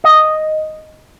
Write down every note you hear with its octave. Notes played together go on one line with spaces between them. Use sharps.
D#5